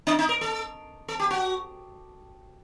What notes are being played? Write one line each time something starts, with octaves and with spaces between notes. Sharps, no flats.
D4
D#4
A#4
A4
A4
G4
F#4